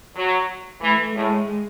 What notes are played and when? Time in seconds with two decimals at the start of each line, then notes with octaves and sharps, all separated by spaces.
0.16 F#3
0.81 E3 A3
1.15 A2 G#3